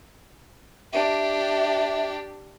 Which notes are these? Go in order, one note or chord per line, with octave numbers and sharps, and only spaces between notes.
D4 G4 E5